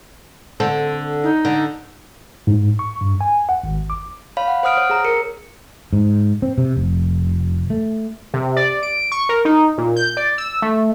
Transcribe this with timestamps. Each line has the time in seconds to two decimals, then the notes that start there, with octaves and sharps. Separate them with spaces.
0.60 D3 C4 A4
1.24 D#4
1.45 D3
2.47 G#2
2.79 C#6
3.01 G2
3.21 G#5
3.49 F#5
3.64 G#1
3.90 D6
4.37 C#5 F5 B5
4.48 F#5
4.63 C5 F#5 D#6 F6 D7
4.77 C#5
4.90 G#4 A#5
5.05 A#4 C#7
5.93 G#2
6.42 C4
6.58 C3
6.77 F1
7.70 A3
8.34 C3
8.56 D5
8.83 D7
9.12 C#6
9.29 A#4
9.45 D#4
9.78 A#2
9.96 G6
10.17 D5
10.38 E6
10.62 A3